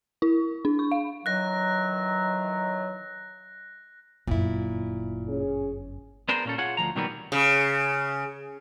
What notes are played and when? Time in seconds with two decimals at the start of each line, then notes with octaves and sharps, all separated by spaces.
0.22 E4
0.65 D4
0.79 C#6
0.92 F5
1.26 D#3 E3 F#3 F#6 A#6
4.27 G1 F#2 A#2 E4
5.28 C#4 G#4
6.29 B3 D4 G#4 A#4 C5
6.45 A#2 C#4 A4
6.58 F4 G#4 C#5 F#5
6.77 D2 F3 A#5
6.95 B2 D#3 F#3 G3 A#3 B3
7.32 C#3